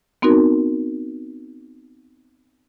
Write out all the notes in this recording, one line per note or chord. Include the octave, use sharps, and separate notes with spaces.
B3 C4 D#4 F#4 A#4